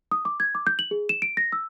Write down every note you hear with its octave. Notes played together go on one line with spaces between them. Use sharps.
D#6
D6
G#6
D6
G6
F#7
G#4
E7
D7
A#6
E6